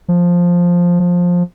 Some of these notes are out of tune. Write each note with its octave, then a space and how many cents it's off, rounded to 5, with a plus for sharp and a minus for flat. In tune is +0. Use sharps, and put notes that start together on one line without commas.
F3 +5
F3 +15